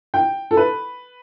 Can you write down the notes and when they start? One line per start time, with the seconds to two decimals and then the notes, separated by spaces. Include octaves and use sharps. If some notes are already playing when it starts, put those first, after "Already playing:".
0.14 G5
0.51 A4
0.57 B4